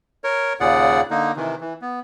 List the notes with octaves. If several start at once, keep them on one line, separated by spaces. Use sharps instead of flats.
A#4 C#5
D#2 A#2 C#3 G#4 D5 F#5
D3 A#3 D#4
C3 D#3 E3
E3
B3